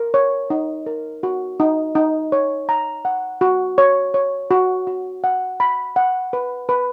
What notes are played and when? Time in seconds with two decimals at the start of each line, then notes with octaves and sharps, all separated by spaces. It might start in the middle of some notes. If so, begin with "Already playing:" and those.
Already playing: A#4
0.14 C#5
0.50 D#4
0.86 A#4
1.23 F#4
1.60 D#4
1.95 D#4
2.32 C#5
2.69 A#5
3.05 F#5
3.41 F#4
3.78 C#5
4.14 C#5
4.51 F#4
4.87 F#4
5.24 F#5
5.60 B5
5.96 F#5
6.33 B4
6.69 B4